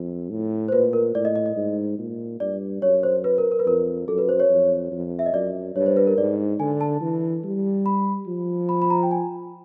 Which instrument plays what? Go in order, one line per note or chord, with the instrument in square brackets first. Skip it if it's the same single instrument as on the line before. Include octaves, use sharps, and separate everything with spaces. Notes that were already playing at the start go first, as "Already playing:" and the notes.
Already playing: [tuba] F2
A2
[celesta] C5
[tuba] A#2 [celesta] B4
[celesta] A#4
[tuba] A2 [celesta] D5
[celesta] D#5
D#5
D#5
[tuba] G#2
A#2
[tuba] G2 [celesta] D5
[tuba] F#2 [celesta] C#5
[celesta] C5
B4
A#4
A#4
B4
[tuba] F2 [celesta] A#4
[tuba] F#2 [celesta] A4
[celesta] B4
C5
C#5
[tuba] F2
F2
[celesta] E5
D#5
[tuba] F#2 [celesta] D5
[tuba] G2 [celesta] C#5
[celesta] C5
B4
A#4
[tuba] G#2 [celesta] D5
[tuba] D3 [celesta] G#5
[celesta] A5
[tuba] E3
G3
[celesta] B5
[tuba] F3
[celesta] B5
B5
A#5
G5
G#5